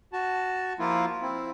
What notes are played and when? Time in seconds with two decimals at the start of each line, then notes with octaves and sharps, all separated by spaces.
0.13 F#4 A5
0.79 F3 A#3 E4 F4
1.22 C4 E4